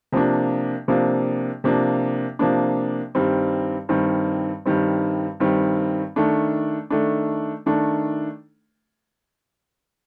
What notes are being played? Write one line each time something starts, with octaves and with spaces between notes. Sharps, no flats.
C3 F3 A#3 D4
C3 F3 A#3 D4
C3 F3 A#3 D4
C3 F3 A#3 D4
G2 D#3 G3 C4
G2 D#3 G3 C4
G2 D#3 G3 C4
G2 D#3 G3 C4
D#3 A3 D4
D#3 A3 D4
D#3 A3 D4